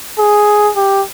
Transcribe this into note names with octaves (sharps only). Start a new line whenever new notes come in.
G#4
G4